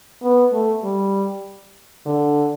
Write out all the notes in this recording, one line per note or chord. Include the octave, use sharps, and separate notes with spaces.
B3
A3
G3
D3